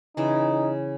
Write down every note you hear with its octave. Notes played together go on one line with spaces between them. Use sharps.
C#3 E3 D#4